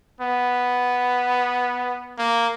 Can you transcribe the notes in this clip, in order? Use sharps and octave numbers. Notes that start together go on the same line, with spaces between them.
B3
A#3